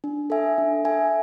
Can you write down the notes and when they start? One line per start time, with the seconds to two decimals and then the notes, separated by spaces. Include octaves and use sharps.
0.04 D4
0.30 A4 E5 G#5
0.58 D4
0.85 A4 E5 G#5